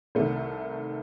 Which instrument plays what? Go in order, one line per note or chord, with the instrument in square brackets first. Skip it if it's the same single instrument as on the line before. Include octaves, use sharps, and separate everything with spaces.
[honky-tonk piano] C2 C3 D#3 A3